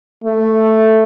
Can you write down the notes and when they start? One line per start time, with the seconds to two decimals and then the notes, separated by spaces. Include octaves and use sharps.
0.24 A3